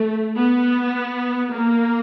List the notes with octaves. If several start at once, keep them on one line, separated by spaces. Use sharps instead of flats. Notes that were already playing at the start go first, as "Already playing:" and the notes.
Already playing: A3
B3
A#3